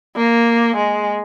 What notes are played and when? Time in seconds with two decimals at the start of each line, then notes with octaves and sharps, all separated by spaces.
0.17 A#3
0.76 G#3